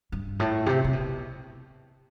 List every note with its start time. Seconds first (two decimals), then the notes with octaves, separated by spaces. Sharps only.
0.12 G2
0.40 A2
0.66 C3
0.84 C3
0.93 B2